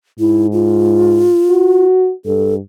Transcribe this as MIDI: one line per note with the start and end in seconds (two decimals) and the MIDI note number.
0.19 1.28 44
0.19 0.46 64
0.53 1.85 65
1.50 2.11 66
2.25 2.58 43
2.25 2.54 69